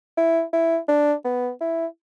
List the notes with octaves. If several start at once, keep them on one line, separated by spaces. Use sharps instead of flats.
E4
E4
D4
B3
E4